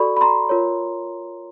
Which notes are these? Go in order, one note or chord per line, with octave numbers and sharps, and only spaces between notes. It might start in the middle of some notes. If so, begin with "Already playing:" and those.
Already playing: F#4 A4 D5 B5 C#6
B5
A#5 C6
F4 A#4 C#5